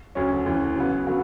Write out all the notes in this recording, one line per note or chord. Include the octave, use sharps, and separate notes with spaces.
D2 C#3 F#3 C#4
D2 C#3 E3
C#3 F#3 B3
D3 F#3 B3 F#4